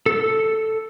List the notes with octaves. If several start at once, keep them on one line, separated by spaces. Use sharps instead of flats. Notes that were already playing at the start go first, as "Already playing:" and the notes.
A4 E6